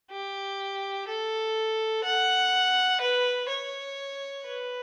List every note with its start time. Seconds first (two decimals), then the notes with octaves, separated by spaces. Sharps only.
0.11 G4
1.07 A4
2.04 F#5
3.01 B4
3.49 C#5
4.45 B4